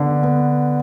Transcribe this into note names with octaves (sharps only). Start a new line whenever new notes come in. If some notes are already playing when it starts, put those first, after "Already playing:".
Already playing: D3 B3
B3